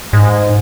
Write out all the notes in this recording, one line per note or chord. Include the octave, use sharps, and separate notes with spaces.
G#2